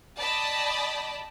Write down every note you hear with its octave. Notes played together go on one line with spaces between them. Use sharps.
D5 D#5 G5 A5 B5